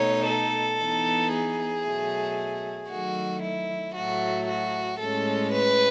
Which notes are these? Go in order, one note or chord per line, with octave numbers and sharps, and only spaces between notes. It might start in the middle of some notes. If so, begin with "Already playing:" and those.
Already playing: B2 A3 D#4 C#5
A4
E3 B3 D#4
G#4
B2 F#3 A3
D#3 F#3 A3 F#4
E4
A2 F#3 A3 F#4
F#4
A2 G#3 C#4 A4
B4